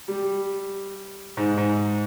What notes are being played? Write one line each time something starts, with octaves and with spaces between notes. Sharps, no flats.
G3
G#2
G#2